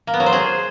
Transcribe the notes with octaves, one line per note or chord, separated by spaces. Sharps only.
A#3
B3
F#3
C5
G#4